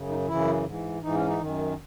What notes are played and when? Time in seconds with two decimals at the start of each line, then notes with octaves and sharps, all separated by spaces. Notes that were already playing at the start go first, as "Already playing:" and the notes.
Already playing: F#2 C#3
0.09 D#4
0.28 F#2 C#3 E3 E4
0.65 G#2 E3
1.02 G#2 E3 D#4
1.15 C#4
1.27 D#4
1.40 F#2 D#3